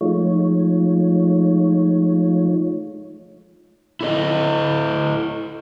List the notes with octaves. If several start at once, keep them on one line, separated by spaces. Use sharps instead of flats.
F3 G#3 A3 D#4 F4 C#5
E4 A4 D#5